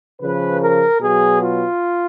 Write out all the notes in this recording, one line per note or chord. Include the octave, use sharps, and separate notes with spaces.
C#3 F3 B4
A#4
B2 F#3 G#4
F4